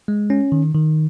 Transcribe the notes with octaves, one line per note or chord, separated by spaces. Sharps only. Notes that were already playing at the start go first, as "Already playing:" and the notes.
G#3
C#4
D#3
D#3